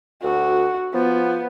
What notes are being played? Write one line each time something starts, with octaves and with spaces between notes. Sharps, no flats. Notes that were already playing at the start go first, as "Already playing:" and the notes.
D2 F#4
F3 B3